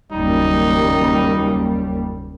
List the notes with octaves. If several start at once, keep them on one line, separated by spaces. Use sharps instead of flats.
F#1 D#2 G3 D#4